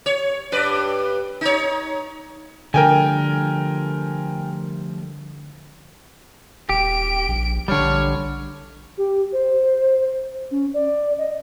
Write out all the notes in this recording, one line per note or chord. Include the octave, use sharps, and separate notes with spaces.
C#5
G2 B4 D5
D#4 C#5
D3 F3 G3 A3 A#4 G5 G#5
D#1 G4 D7
A#1
A#1 D3 G3 C#5 F6
G4
C5
C#4
D5
D#5